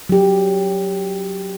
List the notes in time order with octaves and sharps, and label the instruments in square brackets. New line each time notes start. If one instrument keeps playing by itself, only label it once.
[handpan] F#3 G4